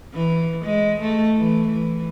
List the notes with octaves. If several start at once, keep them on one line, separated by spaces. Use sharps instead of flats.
E3
G#3
A3
E3
E3